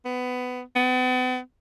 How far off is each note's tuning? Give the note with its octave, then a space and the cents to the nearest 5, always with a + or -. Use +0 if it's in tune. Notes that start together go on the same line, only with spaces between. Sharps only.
B3 +20
B3 +45